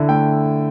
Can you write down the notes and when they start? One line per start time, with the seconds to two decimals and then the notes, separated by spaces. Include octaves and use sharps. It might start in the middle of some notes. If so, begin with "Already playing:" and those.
Already playing: D3 E4
0.09 A3 G5